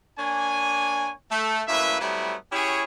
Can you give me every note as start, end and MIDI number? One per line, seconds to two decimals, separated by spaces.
0.19 1.11 58
0.19 1.11 62
0.19 1.11 73
0.19 1.11 80
1.31 1.62 57
1.68 1.98 42
1.68 1.98 45
1.68 1.98 58
1.68 1.98 71
1.68 1.98 76
2.01 2.36 54
2.01 2.36 55
2.01 2.36 57
2.01 2.36 59
2.01 2.36 60
2.01 2.36 64
2.52 2.84 61
2.52 2.84 64
2.52 2.84 67
2.52 2.84 68
2.52 2.84 73